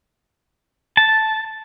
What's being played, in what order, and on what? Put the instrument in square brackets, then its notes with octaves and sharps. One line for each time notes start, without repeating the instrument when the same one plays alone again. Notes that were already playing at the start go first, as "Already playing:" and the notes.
[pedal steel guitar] A5